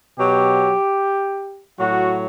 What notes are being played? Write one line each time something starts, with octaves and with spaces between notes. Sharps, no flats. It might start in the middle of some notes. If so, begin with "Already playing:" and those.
B2 F#3 G4
A2 F#3 F#4